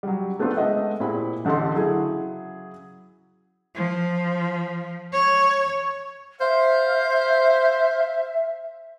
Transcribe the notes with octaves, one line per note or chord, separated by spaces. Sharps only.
F#3 G3
A3 B3 C4 D4 F4 A4
G#3 A3 B3 D#5 E5 F#5
A#2 C4 E4 G4 G#4 B5
A1 D3 G4 A4 D#5 C6
C#3 F#3 E4 F#4 G#4
F3
C#5
C5 E5 F5